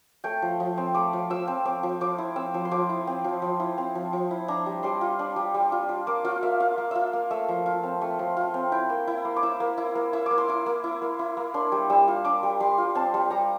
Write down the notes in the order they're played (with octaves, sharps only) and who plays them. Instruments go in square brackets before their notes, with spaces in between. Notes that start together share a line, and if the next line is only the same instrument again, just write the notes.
[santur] A3 G5
F3
F3
C4
A3 D6
F3
F3 E6
C4
C4 D6
F3
F3 D6
E4
C4 E6
F3
C6
F3 D6
E4
C4
F3
F3
E4
C4
F3
F3
E4
D4 A#5
G3
G3 C6
F4
D4
G3
G3
F4
F4
A#3 D6
F4 F5
A#3 E5
F4 F5
A#3
F4 E5 F5
A#3
A3 E5
F3
F4
C4
A3
F3
F4
C4
E4 G5
A#3
E4
A#3
D6
E4 E6
A#3
E4
A#3
E4 E6
A#3 D6
C6
E4 D6
A#3
E4
A#3
E4
A#3
D4 C6
G3
G3 E6
F4
D4 D6
G3
G3 C6
F4
C4 A5
G3
G3 A#5